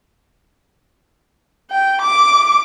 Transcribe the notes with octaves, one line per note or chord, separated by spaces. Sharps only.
G5
D6